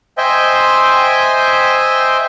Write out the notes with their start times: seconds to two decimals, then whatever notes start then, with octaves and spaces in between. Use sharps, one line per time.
0.18 C5 D#5 E5 G5 G#5